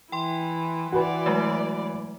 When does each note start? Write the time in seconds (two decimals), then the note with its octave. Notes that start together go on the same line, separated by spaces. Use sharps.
0.12 E3 E4 G5 C6
0.92 E3 F#4 B4 D5
1.26 F#3 G#3 A3